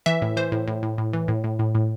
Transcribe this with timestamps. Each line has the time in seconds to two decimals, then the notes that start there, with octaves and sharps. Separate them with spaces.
0.06 E3 E5
0.22 A2
0.37 E3 C5
0.52 A2
0.68 A2
0.83 A2
0.98 A2
1.13 E3
1.28 A2
1.44 A2
1.59 A2
1.75 A2